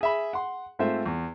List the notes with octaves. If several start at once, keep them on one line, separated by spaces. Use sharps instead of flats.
G#4 E5 B5
F#5 C6
G#2 A3 C4 F4 C5 E5
E2